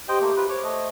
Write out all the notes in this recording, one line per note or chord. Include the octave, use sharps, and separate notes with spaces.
G4 C5 D#5 G5
A3 A#3
F4 B4
C5 C#5 D6
A3 D#5